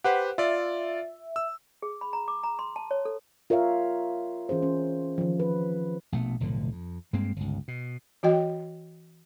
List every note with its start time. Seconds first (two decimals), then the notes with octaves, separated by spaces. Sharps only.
0.04 G4 B4 C5 F#5
0.38 F4 D5 E5
1.36 E6
1.82 G#4
2.01 B5
2.13 A#5
2.28 D6
2.43 A#5
2.59 C6
2.76 A5
2.91 C#5
3.05 A4
3.50 F4 A#4 C#5 E5 F5
4.49 E3 C#4 G#4 C5
4.63 C#4
5.18 D#3 F3
5.40 B4
6.12 A#1 B2 A3
6.40 F1 B1 A2 D3
6.72 F2
7.13 G2 G#3 A#3 C4
7.36 G1 C#2
7.68 B2
8.23 E3 F#4 D#5 G5